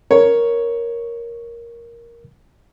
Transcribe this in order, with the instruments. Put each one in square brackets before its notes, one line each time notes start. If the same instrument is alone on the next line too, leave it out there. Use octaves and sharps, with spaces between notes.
[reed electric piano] A#4 [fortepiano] C#5